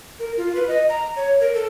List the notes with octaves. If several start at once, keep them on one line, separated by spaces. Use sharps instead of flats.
A#4
F4
B4
D#5
A#5
C#5
A#4
A4